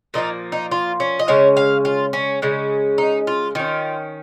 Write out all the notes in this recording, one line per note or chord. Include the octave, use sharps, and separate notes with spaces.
A#2 F3 A#3 D#4
D#4
F4
C#4
D#5
C#3 G#3 C#4 C#5
F5
F4
C#4
C#3 G#3 C#4
D#4
F4
D#3 C#4 F4